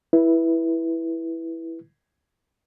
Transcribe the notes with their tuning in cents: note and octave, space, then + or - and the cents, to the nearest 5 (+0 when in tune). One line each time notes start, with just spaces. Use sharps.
E4 +0 B4 -15